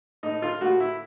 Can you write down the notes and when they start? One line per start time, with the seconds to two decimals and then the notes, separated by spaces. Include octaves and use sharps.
0.23 A2 D#4
0.42 F4
0.61 A2 F#4
0.80 E4